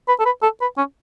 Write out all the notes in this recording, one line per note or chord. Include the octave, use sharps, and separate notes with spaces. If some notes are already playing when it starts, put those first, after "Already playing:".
B4
A4
B4
A4
B4
C#4